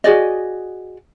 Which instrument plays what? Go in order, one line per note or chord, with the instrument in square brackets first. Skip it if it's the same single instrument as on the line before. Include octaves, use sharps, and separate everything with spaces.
[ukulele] F#4 G#4 D5 D#5